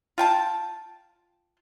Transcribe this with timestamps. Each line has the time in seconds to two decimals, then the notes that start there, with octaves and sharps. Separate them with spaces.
0.18 F4 G5 A5